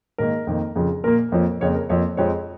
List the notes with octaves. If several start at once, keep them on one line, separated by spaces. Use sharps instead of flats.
G#2 D#3 A#3 A#4
F2 D#3 A#3
F2 C#3 F3
A#2 A#3 A#4
F2 F3 A#3 C#5
F2 C#3 A#3 C#5
A#4
F2 F3 A#3 C#5
F2 F3 G#3 C#5